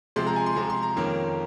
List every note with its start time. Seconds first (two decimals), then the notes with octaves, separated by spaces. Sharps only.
0.16 C3 F3 G#3 C6
0.27 A#5
0.36 G#5
0.46 C6
0.56 C3 F3 G#3 A#5
0.70 C6
0.83 A#5
0.96 F2 D#3 A#3 C#4